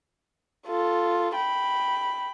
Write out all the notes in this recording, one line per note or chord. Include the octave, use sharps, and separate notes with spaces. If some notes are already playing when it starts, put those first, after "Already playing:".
F4 A4
G5 B5